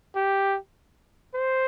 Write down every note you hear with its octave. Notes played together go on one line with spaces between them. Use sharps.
G4
C5